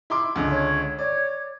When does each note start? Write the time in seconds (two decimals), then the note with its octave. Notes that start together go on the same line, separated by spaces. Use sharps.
0.10 E4 C6 D6
0.36 C#2 D3
0.51 C#5
0.99 C#5 D5